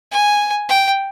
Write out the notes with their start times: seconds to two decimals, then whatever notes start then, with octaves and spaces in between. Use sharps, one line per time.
0.11 G#5
0.69 G5